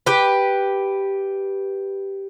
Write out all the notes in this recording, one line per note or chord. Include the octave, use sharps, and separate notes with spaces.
G4 B4